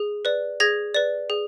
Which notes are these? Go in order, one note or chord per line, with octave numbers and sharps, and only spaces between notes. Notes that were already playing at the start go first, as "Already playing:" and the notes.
Already playing: G#4
B4 D5
G#4 G#6 A#6
B4 D5
G#4